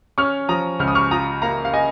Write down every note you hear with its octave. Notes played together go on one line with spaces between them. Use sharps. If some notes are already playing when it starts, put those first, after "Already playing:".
C#4 C#6 F6
F3 A#5 D#6
C#2 F6
D#6
C#6 F6
F4 A#5 D#6
A#3 F5 A#5
F5
D#5 G#5